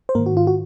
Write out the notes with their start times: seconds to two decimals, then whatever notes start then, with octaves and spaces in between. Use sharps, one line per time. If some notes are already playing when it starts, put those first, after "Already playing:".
0.09 C5
0.15 G#2 D#3 A#3 A#4
0.26 F#4
0.37 F4
0.47 F#4